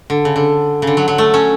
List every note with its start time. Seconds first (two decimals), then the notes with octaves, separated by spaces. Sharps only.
0.10 D3
0.25 C#3
0.36 D3
0.82 C#3
0.87 D3
0.97 F#3
1.08 F#3
1.18 A3
1.34 C#4